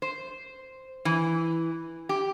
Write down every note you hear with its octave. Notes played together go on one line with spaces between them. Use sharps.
C5
E3
G4